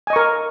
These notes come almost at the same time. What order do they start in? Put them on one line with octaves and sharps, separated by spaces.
G#5 D#5 C#6 A#4